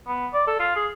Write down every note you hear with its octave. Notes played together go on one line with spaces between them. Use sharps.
B3
D5
A4
F4
G#4